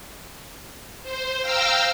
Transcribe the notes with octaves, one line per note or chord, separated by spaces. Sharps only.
C5
F5 G5 A#5 E6 F6